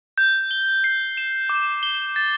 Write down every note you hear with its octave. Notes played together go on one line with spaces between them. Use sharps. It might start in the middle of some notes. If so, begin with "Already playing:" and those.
G6
G7
C7
E7
D6
G7
A6